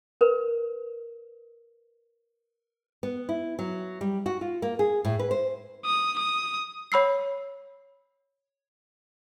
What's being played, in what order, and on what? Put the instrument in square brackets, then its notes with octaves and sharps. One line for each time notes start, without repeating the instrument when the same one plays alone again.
[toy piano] A#4 B4
[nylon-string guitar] B3
E4
F#3
G3
F#4
F4
A#3
G#4
A2
B4
C5
[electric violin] D#6
D#6
[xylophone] C#5 B5 E6 C7